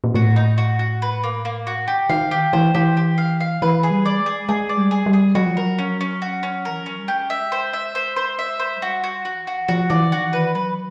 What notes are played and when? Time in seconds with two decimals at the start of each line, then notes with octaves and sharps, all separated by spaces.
0.04 A#2
0.14 A2 F#4
0.36 D#4
0.58 F#4
0.79 F#4
1.02 B4
1.24 A#3
1.45 A#3
1.67 F#4
1.88 D#3 G4
2.09 D#3 F5
2.31 G4
2.53 E3 C5
2.74 E3 G4
2.97 G4
3.18 F5
3.40 F5
3.62 E3 B4
3.83 G#4
3.91 G3
4.05 D5
4.19 G#3
4.26 G#4
4.48 G#3 G#4
4.69 D5
4.77 G3
4.91 G#4
5.06 G3
5.13 G#4
5.35 F#3 F#4
5.46 F3
5.57 F#3 A#4
5.78 C#4
6.01 C#4
6.22 F#4
6.43 C#4
6.65 E3 A#4
6.78 F3
6.86 F#3 C#4
6.99 G3
7.08 G#3 G4
7.30 E5
7.52 C5
7.73 E5
7.95 C5
8.16 C5
8.39 E5
8.59 C5
8.76 F#3
8.82 G3 F#4
9.04 F#4
9.25 F3 F#4
9.35 E3
9.46 D#3 F#4
9.56 E3
9.68 F3 F#4
9.90 E3 D5
10.12 D#3 F#4
10.33 E3 B4
10.55 F#3 B4